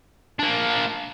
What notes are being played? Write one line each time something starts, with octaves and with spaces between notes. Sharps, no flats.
A#3 D4